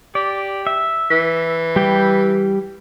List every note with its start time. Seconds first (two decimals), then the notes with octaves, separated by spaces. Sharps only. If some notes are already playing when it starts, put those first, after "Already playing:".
0.15 G4 D5
0.67 E5
1.11 E3
1.76 G3 G4 G5